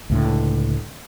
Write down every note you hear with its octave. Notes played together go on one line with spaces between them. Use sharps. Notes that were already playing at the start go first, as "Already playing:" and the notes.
C#2 A2 D3